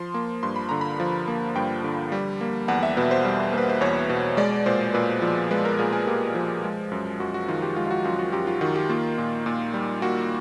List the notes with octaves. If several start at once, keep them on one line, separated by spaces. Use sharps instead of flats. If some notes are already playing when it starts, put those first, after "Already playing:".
Already playing: F3 C6
A#3
G2 C6
B5
D3 A#5
B5
F3
A#3
G2 G5
D3
G3
A#3
E2 F#5
E5
B2 B4
C5
G3
A#3 B4
C5
E2 C#5
B2
G#3 D5
A#2 C5
A#2 B4
F3
G#3 B4
A#4
A#2 G#4
G#4
A#2 G4
F3
G#3
F#2
F#2 F#4
F#4
D#3 F4
G4
G#3 F4
F4
F#4
F#2 F4
F#4
F#2 G4
F4
D#3 F#4
G4
A#3 F4
A#2
A#2
G3
A#3 F#4